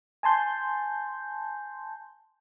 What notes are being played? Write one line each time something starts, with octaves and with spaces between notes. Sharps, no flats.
G#5 A5 C6 G6